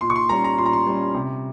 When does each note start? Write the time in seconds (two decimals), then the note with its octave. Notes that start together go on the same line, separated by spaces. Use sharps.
0.01 A#2 C6
0.10 C#6
0.16 C6
0.29 G3 C#4 A#5
0.44 A#5
0.58 A#2 C6
0.66 A#5
0.73 C6
0.87 G3 C#4
1.14 C3